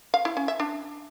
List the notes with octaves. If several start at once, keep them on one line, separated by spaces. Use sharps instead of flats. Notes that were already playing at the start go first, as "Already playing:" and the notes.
F5
E4
C#4
E5
D4